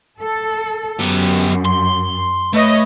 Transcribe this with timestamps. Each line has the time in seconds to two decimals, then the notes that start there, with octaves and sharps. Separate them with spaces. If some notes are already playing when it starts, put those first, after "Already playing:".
0.20 A4
1.00 F#2 B3 G4
1.65 C6
2.54 A3 B4 C#5 D#5